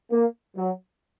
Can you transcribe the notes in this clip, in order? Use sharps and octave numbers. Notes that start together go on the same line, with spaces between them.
A#3
F#3